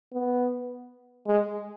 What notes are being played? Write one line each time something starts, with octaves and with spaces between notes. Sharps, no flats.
B3
G#3